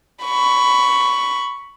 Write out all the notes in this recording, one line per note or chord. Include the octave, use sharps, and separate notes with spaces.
B5 C#6